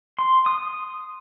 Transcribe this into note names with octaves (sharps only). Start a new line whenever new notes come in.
C6
D#6